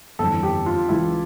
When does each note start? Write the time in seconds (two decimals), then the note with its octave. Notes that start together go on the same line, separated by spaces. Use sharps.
0.19 G1 F2 E3 A4
0.43 G4
0.66 F4
0.89 C#2 C#3 E3 E4